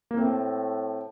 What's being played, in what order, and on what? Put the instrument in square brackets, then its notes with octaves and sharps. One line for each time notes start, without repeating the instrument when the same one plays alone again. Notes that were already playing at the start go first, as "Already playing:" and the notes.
[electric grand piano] A#3
[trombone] A2 [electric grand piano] C4